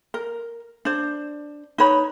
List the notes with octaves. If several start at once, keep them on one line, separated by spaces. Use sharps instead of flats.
A#4
D4 C5
D#4 B4 C#5 B5